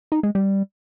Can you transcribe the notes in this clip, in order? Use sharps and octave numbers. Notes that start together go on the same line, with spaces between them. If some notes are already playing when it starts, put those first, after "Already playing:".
D#4
G#3
G3